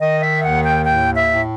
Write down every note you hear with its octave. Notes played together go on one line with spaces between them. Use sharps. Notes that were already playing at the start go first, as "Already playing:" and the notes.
D#3 D#5
E5
D#2 F#5
G5
A2 G5
E5
A2